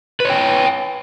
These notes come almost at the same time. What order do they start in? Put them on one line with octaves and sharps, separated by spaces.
B4 C#5 G5